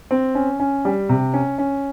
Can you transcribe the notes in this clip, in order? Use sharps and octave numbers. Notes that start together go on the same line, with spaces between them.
C4
C#4
C#4
G3
C3
C#4
C#4